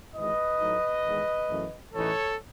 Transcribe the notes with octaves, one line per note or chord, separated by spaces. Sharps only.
G#1 G#2 E3 B4 D#5
A2 F#3 A3 D#4
E2 D#3 G#3
F#2 E3 A3
A1 A2 E3 A3 D#4 A4 C#5